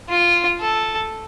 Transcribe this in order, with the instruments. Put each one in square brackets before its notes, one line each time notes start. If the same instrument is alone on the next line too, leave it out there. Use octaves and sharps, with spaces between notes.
[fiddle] F4
A4